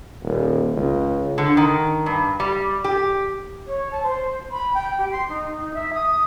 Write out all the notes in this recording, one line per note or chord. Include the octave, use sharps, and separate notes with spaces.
D#1
C#2
D3
D#3
G2
G3
G4
C#5
A5
C5
B5
G5
G4
C6
D#4
D#4
E5
D#6